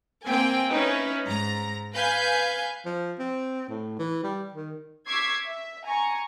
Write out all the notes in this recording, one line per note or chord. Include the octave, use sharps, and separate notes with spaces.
A#3 C4 G5 G#5
C#4 D#4 E4 B4
G#2 A#5
B4 F5 G#5 G6
F3
C4
A2
E3
G3
D#3
C#6 D6 E6 G#6 B6 C7
E5
G#5 A#5 C#6